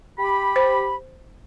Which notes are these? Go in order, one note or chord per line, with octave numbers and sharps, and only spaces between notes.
G4 B5
C5